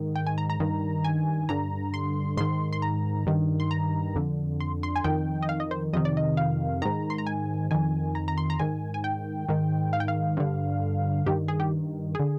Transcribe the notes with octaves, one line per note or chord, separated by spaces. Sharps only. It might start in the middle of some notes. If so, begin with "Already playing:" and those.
Already playing: G#2 D#3
G5
G#5
A#5
A#5
G2 D#3
G#5
G2 D3 A#5
C6
G#2 D#3 C6
C6
A#5
G2 D#3
C6
A#5
F2 D3
C6
C6
G#5
F2 D#3 G5
D#5
F5
D#5
C5
F2 C3 D#3 D#5
D5
D#5
F5
G#2 D#3 A#5
C6
A#5
G#5
F2 D#3 G#5
A#5
A#5
C6
A#5
G#2 D#3 G#5
G#5
G5
G#2 D#3
F5
G5
F5
G2 D3
G2 D#3 G4
G#4
G4
D3 G#4